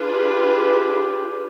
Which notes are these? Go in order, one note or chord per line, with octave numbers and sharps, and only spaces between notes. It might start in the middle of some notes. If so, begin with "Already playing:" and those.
Already playing: D4 F4 G#4 B4
G4